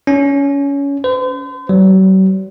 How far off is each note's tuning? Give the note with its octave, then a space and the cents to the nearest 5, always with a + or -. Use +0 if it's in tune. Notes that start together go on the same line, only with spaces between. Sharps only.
C#4 +20
C5 -40
F#3 +45